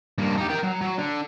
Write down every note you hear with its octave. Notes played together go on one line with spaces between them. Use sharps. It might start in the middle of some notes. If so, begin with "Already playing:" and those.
G2 A#3
D#4 G4
A#4 G5
F#3
F#3
D3